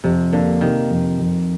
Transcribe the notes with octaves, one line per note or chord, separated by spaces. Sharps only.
F2 C3
D3 A#3
C3 D#3
F2
F2